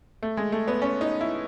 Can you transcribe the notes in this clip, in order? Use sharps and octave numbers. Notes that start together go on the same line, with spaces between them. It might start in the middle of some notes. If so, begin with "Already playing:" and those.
A3
G#3
A3
B3
C#4
D#4
E4